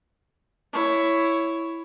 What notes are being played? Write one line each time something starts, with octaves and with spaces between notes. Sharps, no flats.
E4 C#5